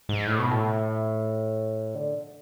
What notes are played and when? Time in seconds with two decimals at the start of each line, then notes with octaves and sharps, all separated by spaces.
0.09 G#2
0.27 A2
0.39 B2
0.51 A2
1.95 D3